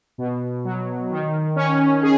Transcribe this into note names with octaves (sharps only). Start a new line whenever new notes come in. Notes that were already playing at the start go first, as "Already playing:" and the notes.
B2
F#3
D#3
C#4
G#4